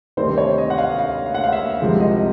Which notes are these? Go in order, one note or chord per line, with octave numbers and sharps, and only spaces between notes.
D2 C3 D#3 G3 C4 C5
C#5
D#5
F#5
F5
F5
F5
F#5
F5
E5
C2 C3 F3 G#3 C4
D#5